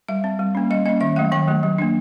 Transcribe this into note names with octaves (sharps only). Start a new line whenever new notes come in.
G3 E5
C4
G3
A#3 C#4
G3 D#5
A#3 C#4 D#5
D#3 E5
F#3 A3 F5
D#3 G5
F#3 A3
F#3
A#3 D4